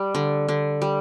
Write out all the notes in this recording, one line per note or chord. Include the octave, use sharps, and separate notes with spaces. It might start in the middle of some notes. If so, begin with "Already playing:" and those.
Already playing: G3
D3
D3
G3